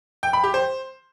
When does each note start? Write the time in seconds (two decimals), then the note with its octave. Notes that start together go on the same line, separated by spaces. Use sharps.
0.23 G5
0.33 B5
0.44 G4
0.54 C5